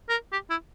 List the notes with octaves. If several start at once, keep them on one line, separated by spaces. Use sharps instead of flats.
A#4
G4
E4